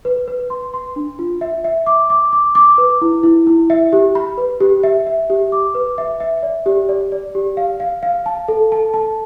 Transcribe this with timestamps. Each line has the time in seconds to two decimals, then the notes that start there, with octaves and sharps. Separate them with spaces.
0.05 B4
0.28 B4
0.50 C6
0.74 C6
0.96 D4
1.19 F4
1.41 E5
1.64 E5
1.86 D6
2.10 D6
2.33 D6
2.55 D6
2.78 B4
3.02 E4
3.23 E4
3.47 E4
3.70 E5
3.93 G4
4.15 B5
4.38 B4
4.61 G4
4.83 E5
5.07 E5
5.30 G4
5.52 D6
5.75 B4
5.98 E5
6.20 E5
6.43 D5
6.66 G4
6.89 D5
7.12 D5
7.35 G4
7.57 F5
7.80 F5
8.03 F5
8.26 A5
8.48 A4
8.72 A5
8.94 A5